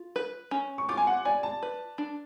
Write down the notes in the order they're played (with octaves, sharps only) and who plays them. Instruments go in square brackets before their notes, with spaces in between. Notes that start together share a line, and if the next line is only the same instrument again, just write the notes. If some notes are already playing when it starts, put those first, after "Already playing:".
Already playing: [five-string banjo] F4
B4
C#4
[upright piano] C#6
[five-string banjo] F4 [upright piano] D6
[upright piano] G#5
F#5
[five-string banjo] D5 [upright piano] G#5
[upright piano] A5
[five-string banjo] B4
D4